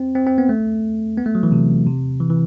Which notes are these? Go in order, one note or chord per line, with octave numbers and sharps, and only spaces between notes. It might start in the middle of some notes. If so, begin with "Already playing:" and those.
Already playing: C4
C4
C4
B3
A3
B3
A3
F#3
E3
C3
C3
E3
E3